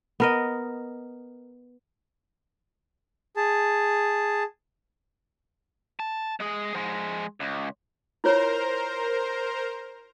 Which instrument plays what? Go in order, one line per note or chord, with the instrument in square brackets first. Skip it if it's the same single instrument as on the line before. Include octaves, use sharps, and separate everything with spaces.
[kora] B3 A#4 D#5
[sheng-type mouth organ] G#4 A5
[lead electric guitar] A5
G#3 G#4
F3 G#3
C#2
[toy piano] E4 F4 C#5 [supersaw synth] A#4 C5 A#5